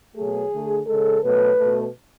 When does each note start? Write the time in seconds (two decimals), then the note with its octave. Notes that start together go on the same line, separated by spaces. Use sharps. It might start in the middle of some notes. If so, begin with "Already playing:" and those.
0.16 B2 F#3 A3 G#4
0.52 D3 A3
0.87 C#3 G#3 A4
1.22 B2 F#3 A3 B4
1.58 B2 A3